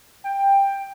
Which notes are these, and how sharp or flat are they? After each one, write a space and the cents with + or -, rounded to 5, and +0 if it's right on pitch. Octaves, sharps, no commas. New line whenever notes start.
G5 +10